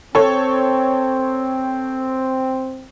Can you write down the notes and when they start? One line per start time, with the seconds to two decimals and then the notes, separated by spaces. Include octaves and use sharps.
0.15 C4 A4 C#5